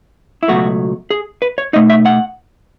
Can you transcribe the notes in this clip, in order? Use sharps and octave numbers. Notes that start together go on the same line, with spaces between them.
E4
C#2 B2 F#3 A3 F#4
G#4
B4
C#5
B2 A3 D#4 D#5
E5
F#5